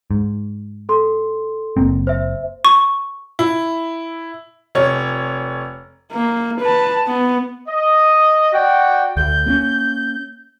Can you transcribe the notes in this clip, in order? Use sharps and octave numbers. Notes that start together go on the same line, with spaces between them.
G#2
A4 C6
F#1 A#3 C4
C5 E5
C#6
E4
F1 C#5
A#3
B4 A5
B3
D#5
F#4 D5 F#5 G5
D2 G6
A#3 C4 C#4